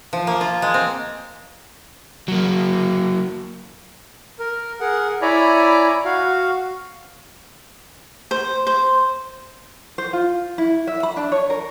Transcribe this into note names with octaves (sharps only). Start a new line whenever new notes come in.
F3
A#3
F4
G#3
C4
F#3 A#3
A#4
G#4 A#4 F#5
E4 C#5 D5 G#5 A#5 B5
F#4 F5
C5
C5
C5
F4
E4
E5
B5
D4
C#5
A#4